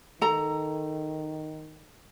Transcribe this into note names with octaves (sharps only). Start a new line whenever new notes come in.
D#3 A4 A#5